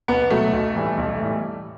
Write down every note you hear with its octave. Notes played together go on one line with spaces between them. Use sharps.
B1 B3
B2 F#3 A3
B1
A2 E3 G3
B1
A2 E3 G3